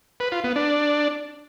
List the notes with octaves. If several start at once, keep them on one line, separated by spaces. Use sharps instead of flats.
B4
F4
B3
D4